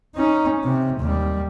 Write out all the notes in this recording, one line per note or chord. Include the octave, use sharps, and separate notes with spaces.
C#4 D#4
C3
D#2 G3